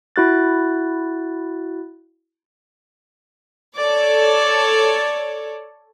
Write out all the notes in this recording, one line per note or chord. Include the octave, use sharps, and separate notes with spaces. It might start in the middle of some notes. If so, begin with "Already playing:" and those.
E4 F#4 F#6 A6
A4 C#5 D5